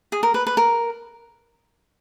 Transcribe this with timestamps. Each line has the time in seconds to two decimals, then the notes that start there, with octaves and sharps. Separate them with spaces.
0.12 G#4
0.23 A#4
0.34 B4
0.47 B4
0.57 A#4